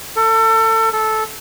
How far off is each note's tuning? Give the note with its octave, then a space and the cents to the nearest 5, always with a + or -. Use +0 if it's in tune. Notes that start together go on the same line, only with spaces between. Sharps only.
A4 +30
A4 -10